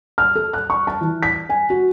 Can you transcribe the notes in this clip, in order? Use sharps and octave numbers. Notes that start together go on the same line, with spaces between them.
F6
A4
F#6
C#6
A5
E3
B6
G#5
F#4